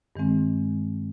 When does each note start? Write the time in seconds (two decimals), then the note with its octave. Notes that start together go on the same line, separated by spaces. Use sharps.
0.16 G2 D#3 G#3 C4